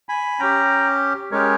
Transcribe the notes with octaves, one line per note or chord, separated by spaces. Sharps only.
G#5 B5
C#4 G4 G5 A#5
G#3 C#4 G4 A#4 C#5